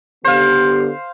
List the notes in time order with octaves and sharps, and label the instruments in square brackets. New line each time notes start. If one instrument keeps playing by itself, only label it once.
[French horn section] D3 B3 G4 [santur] C5 F5